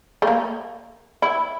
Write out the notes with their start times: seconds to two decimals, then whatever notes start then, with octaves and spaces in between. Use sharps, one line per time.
0.22 A3
0.27 A#3
1.22 E4